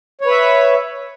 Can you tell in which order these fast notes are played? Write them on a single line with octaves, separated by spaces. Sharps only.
C#5 B4 E5